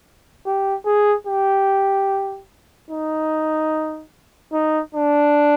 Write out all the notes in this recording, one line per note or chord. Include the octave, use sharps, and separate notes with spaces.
G4
G#4
G4
D#4
D#4
D4